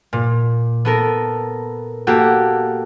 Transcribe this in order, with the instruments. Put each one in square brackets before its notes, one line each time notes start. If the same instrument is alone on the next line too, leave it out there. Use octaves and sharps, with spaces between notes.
[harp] A#2
B3 A4 A#4
A#3 F#4 G4 A4